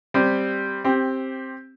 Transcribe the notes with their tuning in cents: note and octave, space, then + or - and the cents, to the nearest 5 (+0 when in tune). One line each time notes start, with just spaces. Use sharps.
G3 +0 C4 +0 G4 +0
C4 +10 G4 +0